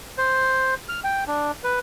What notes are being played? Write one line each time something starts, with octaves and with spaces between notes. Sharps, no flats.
C5
F6
G5
D4
B4